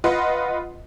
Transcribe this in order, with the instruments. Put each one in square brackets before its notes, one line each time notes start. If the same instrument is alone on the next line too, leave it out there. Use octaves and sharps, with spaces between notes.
[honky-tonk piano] F4 B4 D#5 F#5 C6